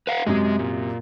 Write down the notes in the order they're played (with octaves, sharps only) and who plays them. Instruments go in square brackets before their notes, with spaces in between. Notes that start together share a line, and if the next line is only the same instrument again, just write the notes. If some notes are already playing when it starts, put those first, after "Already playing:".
[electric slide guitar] B4 F5 F#5
[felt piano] F#2 C3 [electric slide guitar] G#3
[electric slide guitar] A#2